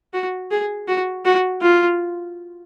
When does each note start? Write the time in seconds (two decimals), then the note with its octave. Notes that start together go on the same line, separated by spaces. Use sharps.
0.13 F#4
0.51 G#4
0.88 F#4
1.25 F#4
1.62 F4